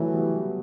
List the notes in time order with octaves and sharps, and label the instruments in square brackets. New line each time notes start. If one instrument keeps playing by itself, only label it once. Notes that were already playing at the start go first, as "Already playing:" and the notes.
Already playing: [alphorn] E3 [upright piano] F#3 A3
[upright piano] G3 B3